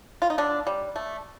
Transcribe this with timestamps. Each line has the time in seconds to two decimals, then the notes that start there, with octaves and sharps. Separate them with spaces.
0.22 F4
0.30 D#4
0.38 D3 D4
0.67 G3
0.96 A3